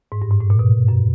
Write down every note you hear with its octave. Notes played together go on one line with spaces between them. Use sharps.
G#2
G2
G#2
A2
A#2
B2
F#2